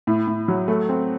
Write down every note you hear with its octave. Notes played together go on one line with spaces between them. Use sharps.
A2
A2
F#3
A3
C4